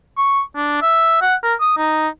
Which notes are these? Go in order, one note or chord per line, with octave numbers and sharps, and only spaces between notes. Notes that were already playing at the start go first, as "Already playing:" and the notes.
C#6
D4
E5
F#5
A#4
D#6
D#4